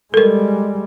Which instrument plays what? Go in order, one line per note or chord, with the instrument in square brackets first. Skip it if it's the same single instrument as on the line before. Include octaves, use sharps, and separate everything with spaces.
[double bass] G3 G#3 [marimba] A4 A#4